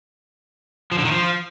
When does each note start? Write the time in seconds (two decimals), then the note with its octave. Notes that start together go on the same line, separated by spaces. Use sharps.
0.92 F3
0.98 D3
1.05 D#3
1.12 F3